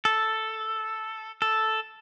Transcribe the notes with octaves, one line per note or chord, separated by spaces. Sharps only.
A4
A4